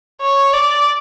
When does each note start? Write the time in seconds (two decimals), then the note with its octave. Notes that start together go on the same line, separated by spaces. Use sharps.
0.22 C#5
0.53 D5